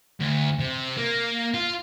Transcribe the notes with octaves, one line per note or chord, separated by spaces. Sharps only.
D2
C3
A#3
F4